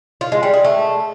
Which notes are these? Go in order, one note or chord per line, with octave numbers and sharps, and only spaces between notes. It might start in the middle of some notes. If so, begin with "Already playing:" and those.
F4
G#3
G3
G#4
A3